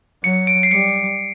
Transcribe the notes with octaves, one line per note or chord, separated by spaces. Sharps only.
F#3 C#7
D7
C7
G3 C#7